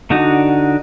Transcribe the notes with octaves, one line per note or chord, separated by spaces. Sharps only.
D3 D4 D#4 F#4